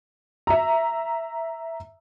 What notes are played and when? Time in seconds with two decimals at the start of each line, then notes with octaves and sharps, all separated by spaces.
0.47 E5 A#5